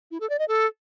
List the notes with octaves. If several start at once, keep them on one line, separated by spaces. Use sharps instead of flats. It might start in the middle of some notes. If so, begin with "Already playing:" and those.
E4
A4
D5
D#5
A4